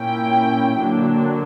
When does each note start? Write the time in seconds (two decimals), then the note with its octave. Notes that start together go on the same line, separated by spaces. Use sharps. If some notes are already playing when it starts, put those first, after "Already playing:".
Already playing: A#2 A#3 C#4 E4 G5
0.79 D3 F#3 A#3 D4